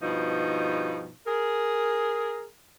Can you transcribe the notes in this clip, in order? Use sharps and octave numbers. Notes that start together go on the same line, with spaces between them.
G2 B2 F3 D#4
G#4 A#4